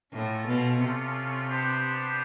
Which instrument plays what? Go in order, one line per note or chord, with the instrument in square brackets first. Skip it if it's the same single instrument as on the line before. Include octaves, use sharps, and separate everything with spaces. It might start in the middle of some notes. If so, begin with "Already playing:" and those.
[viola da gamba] A2 [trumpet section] C#4 F4 A4
[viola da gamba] B2
C3
[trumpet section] B3 D4 G4 C5